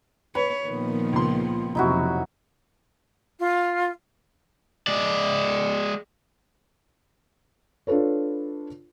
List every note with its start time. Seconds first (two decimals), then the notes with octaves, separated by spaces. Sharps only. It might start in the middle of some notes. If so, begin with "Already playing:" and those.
0.35 B4 C#5 B5
0.68 A#2 D#3 F3 B3
1.13 C#2 C6
1.75 F2 C3 F#3 D#4 E4 F#4
3.39 F4
4.87 G#3 D5
7.87 D4 F4 A4 B4 C#5